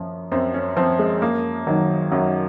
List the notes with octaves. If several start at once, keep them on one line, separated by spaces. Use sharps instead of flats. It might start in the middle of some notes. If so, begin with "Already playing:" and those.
Already playing: F#2 F3
F#2 C4
C#4
F3 C4
G#3
F#2 A#3
D#3 F#3
F#2 F#3